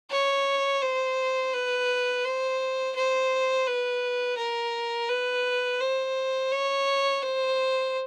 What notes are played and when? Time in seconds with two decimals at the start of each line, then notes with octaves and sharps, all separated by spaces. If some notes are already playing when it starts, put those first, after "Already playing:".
0.11 C#5
0.82 C5
1.54 B4
2.25 C5
2.95 C5
3.67 B4
4.38 A#4
5.09 B4
5.81 C5
6.52 C#5
7.22 C5